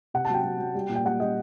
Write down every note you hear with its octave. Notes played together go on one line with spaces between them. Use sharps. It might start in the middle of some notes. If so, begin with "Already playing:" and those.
C3 F#5
A5
F#3 G5
F#3
F#3
G3
A#2
G5
G3 F#5
G3 D#5